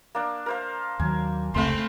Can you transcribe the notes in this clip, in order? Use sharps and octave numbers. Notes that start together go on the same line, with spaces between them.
A#3 D4
A#4 C5 F5
D#2 D#3 F#3 G#5
F1 C#2 C3 A3 C4 F5 B5 C6